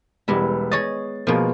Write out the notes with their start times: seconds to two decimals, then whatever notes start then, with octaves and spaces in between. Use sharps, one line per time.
0.28 E1 G3 G#3 B3 E4 G4
0.72 G#4 C#5 D#5 A6
1.27 B2 F3 G#3 A#3 F4